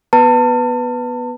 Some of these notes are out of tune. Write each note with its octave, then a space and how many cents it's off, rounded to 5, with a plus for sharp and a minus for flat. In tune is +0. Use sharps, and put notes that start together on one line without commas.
B3 +0 B4 +0 A5 +35